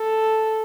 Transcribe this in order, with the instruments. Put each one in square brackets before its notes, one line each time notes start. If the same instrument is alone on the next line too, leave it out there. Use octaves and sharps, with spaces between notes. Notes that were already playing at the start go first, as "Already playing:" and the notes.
Already playing: [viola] A4